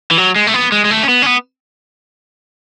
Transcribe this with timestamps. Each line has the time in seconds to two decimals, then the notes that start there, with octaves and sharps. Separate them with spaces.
0.11 E3
0.18 F#3
0.36 G#3
0.47 A3
0.54 B3
0.72 G#3
0.85 G#3
0.91 A3
1.03 C#4
1.09 B3
1.22 C#4
1.26 B3